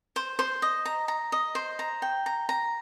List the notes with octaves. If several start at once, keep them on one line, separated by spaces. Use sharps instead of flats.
C5
C5
D#5
A#5
A#5
D#5
C5
A#5
G5
A#5
A#5